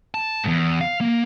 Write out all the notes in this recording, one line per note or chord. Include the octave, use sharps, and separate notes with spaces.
A5
E2 G#2
F5
A#3